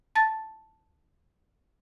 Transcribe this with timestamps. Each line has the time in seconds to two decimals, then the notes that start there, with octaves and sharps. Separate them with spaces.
0.15 A5 A6